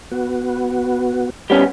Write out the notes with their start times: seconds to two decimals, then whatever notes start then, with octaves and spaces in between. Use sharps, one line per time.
0.11 B3 F#4
1.50 G3 B3 C#4